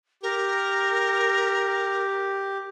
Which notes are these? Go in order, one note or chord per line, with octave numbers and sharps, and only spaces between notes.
G4 A#4